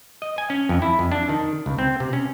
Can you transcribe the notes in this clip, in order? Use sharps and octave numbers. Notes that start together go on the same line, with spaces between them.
D#5
G#5
C#4
F2
E4
F2
D4
D#3
C#2
C4
C3
C#4